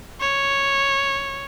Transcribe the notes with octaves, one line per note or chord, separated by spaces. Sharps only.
C#5